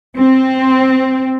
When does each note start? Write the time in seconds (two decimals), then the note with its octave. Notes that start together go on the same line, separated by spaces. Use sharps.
0.17 C4